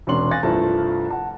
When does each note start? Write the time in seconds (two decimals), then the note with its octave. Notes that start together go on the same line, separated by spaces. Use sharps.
0.07 E1 C3 C#4 D4 C6 F#7
0.31 F5 G#5 F#6 A6 A#6
0.43 C2 G2 F3 A3 A5
1.11 F#5 A5